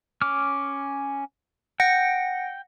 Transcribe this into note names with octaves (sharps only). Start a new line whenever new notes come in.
C#4 D6 F6
F#5 G5 A#6 C#7